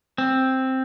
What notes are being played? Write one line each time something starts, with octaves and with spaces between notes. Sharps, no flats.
C4